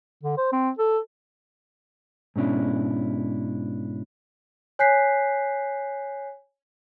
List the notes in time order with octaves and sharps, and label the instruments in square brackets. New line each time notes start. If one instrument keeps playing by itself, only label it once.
[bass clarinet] D3
C5
C4
A4
[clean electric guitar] G#2 B2 C#4 D4 E4
[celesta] C#5 G#5 F#6 G6 B6 C7